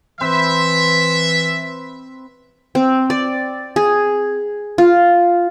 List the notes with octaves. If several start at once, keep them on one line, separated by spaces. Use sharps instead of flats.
E3 C4 B4 C5 E5
C4
D5
G#4
F4